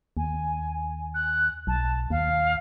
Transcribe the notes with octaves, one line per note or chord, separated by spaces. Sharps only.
D#2 G#5
F#6
B1 A5
D#2 F5